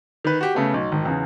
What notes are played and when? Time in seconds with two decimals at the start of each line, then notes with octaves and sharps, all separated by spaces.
0.24 D#3 B4
0.41 F#4 G4
0.55 C#3 A3 B3
0.74 B1
0.92 G#1
1.05 E2 C#3